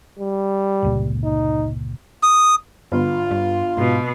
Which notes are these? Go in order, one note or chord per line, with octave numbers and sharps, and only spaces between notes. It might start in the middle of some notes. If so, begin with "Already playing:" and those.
G3
G1 C#2 A#2
D#4
D#6
G1 G2 F4
G2
G#2 B2